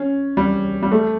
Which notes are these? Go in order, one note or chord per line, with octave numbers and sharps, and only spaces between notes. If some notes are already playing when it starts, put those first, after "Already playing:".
Already playing: C#4
G3
G3
A3